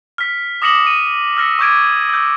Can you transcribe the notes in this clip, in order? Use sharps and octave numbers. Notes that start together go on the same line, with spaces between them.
F6 B6
D6 D#6 A#6 C#7 E7 F#7
D#7
E6 F6 A#6 C#7
C#6 D6 G6 G#6 D7
E6 G6